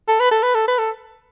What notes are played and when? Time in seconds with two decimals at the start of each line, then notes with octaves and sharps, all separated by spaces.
0.08 A4
0.20 B4
0.31 A4
0.43 B4
0.55 A4
0.68 B4
0.78 A4